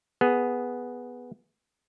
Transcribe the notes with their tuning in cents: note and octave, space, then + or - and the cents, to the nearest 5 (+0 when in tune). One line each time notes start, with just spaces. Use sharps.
B3 +0 G#4 +0